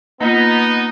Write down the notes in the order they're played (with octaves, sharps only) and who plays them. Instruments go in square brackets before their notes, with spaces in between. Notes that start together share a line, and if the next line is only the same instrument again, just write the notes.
[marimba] A#3 F4 [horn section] B3 D#4